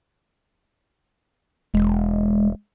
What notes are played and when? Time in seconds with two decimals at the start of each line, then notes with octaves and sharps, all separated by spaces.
1.74 E1 G#3